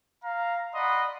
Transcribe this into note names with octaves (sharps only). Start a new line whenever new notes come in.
F5 A#5
D5 D#5 F#5 B5 C6